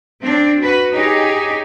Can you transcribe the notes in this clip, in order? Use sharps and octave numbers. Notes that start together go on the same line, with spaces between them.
C4 D4
F#4 B4
D#4 G4 G#4 C#5